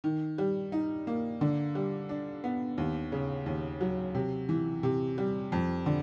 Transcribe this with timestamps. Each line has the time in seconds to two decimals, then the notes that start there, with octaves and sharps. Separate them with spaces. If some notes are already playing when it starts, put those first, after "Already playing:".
0.04 D#3
0.38 G3
0.72 D#4
1.07 A#3
1.41 D3
1.75 G3
2.09 D4
2.44 B3
2.78 D#2
3.12 C#3
3.46 D#2
3.81 F#3
4.15 C3
4.49 E3
4.83 C3
5.18 G3
5.52 F2
5.86 D3